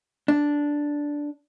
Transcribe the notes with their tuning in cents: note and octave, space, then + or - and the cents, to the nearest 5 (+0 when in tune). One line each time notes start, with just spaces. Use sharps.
D4 -5